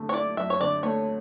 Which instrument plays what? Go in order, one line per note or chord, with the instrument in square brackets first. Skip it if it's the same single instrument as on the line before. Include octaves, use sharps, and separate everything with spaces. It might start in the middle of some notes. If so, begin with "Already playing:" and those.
Already playing: [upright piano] F#2 D3 A3
[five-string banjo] C#5
[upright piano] E4 [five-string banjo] D5
[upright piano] F#2 [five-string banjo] E5
[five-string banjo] C#5
[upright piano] D3 [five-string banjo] D5
[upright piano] A3 [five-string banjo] C#5